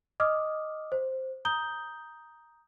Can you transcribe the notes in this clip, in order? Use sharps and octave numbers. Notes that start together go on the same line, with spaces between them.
D#5 D6 D#6 F6
C5
A#5 D#6 G6 G7